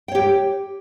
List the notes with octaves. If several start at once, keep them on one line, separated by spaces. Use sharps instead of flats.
G4 C#5 G5